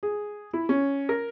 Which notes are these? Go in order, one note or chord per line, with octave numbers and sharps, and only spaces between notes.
G#4
E4
C#4
A#4